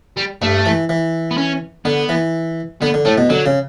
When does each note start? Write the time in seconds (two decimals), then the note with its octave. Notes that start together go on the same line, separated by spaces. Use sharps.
0.17 G3
0.42 G2 A3
0.66 E3
0.89 E3
1.31 B3
1.38 C#4
1.85 D3 B3
2.09 E3
2.81 D3 B3
2.94 D3
3.05 A2 A3
3.18 B2
3.30 D3 F#3
3.46 C#3